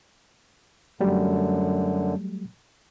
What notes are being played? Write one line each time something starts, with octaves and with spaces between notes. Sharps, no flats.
F#2 D3 F#3 G3 A3